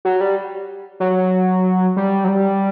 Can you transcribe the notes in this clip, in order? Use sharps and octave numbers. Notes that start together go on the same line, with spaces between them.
F#3
G3
F#3
G3
F#3
G3